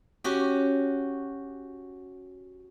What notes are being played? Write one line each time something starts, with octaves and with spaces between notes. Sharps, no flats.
C#4 F#4 G4